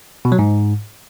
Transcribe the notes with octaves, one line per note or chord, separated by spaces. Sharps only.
B2
F#3
G#2